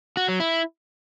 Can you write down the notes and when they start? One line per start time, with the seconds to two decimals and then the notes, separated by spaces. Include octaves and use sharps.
0.17 F#4
0.28 F#3
0.40 E4